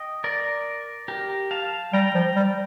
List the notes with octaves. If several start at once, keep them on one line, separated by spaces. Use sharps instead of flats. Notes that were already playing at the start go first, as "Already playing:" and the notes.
Already playing: D#5 G5
A#4 D5
G4 A#4
F5 A5
G3 G5 A#5
F3
G3